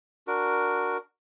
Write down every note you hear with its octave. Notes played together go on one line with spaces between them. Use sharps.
D4 F#4 A#4